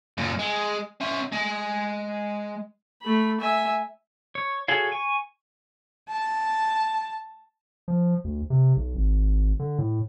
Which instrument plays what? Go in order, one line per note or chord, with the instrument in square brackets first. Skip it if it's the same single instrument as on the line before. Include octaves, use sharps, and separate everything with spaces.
[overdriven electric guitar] F#2 A#2
G#3
C#4 E5
G#3
[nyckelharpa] A3 B5
E5 G#5
[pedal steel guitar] C#5
F#4 G#4 A4 C#5 F5
G#5 C#6
[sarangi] A5
[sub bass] F3
D2
C3
B1
G#1
D3
A2